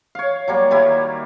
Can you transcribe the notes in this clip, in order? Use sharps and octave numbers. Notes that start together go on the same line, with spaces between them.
C#5 F5
F#3 G3 A#3
D#3 G3 A#3 E4